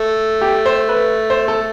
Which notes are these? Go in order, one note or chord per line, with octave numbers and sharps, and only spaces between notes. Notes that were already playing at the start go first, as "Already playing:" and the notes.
Already playing: A3
G4
C5
B4
C5
A4